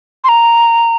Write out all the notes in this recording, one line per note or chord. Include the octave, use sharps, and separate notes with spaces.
C6
A#5